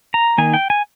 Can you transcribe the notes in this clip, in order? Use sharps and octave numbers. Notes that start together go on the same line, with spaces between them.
A#5
D#3 A#3 D#4 G#5
G5
G#5